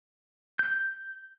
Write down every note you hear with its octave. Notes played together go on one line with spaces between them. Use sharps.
G6